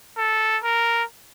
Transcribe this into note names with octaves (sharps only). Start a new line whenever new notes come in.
A4
A#4